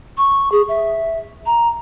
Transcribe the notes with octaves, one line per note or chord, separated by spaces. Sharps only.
C#6
G#4
E5
A#5